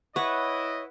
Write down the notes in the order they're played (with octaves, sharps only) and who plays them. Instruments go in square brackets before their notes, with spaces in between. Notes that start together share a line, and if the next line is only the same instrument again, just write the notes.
[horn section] E4 [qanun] B4 F#5 [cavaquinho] C#5 [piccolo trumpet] D#5